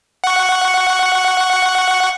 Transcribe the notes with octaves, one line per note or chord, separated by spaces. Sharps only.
F#5 C#6